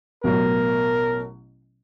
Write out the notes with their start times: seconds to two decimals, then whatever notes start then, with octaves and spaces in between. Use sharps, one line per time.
0.24 A1 B2 F#3 A#4